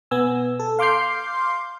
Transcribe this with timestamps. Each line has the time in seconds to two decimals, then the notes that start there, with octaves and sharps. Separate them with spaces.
0.11 B2 B3 G#5 E6
0.60 A4
0.79 F5 C6 D6 F6 G6 C7